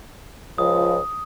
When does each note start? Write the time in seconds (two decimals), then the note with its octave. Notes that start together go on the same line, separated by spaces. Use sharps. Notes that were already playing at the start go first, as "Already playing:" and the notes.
0.58 C#2 F3 D#6